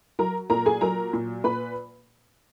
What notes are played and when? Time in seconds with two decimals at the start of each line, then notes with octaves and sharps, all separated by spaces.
0.19 F#3 A#4 A#5
0.50 A#2 A#4 A#5
0.66 G#4 G#5
0.81 F#3 A#4 A#5
1.13 A#2
1.44 A#2 B4 B5